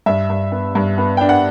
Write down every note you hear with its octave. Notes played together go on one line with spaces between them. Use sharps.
G2 E5
G2
B3
G2
B3
D4 G5
F#5